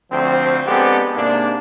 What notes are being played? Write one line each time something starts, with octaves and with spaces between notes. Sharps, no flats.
D2 F3 C4
G#3 B3 C4 D4 G4 A4
G#2 C3 A#3 D4